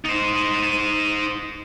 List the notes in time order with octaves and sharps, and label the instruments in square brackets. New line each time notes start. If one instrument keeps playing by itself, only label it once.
[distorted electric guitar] D#4 C5